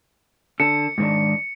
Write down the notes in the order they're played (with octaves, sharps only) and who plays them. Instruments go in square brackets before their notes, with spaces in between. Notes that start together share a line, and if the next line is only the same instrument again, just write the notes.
[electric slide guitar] D3 A4 [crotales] C#7
[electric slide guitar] G#2 D#3 D4